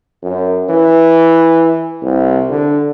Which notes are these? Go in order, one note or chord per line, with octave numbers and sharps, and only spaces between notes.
F#2
E3
C2
D3